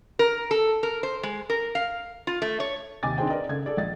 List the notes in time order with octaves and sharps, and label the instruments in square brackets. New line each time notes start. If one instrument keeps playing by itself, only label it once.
[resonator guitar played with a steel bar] A#4
A4
A#4
C5
G#3
A#4
F5
F4
A3
C#5
[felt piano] D#2 C3 D#5 G#5 D6 A6
C4 D4 D#4 G#4 C5 G5
A#4 B4 D5 D#5
C#3 A4 D#5 G#6
G#4 A4 D5
A#1 D#5 A6